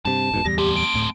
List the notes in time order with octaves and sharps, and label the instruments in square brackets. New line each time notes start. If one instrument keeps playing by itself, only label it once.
[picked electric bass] G2 C3 [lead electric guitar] A5
[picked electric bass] E1 G#2 B2
[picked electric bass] D1 E2 G3 [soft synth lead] A#6
[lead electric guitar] A3 C4 [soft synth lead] G4
[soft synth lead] D7
[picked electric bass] D1 A2